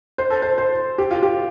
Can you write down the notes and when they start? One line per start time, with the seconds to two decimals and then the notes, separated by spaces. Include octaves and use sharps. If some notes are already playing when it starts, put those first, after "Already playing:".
0.18 C5
0.30 A4
0.42 C5
0.58 C5
0.98 G4
1.11 F4
1.23 G4